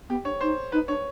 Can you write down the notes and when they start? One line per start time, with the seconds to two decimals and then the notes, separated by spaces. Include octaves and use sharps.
0.09 B3 G4
0.25 D4 C#5
0.40 D#4 C5
0.72 D#4 B4
0.88 D4 C#5